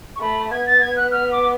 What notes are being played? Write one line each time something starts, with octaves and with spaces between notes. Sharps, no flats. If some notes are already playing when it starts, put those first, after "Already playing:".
C#6
A3 B5
B3 G#6
A6
G#6
F#6
F6
D6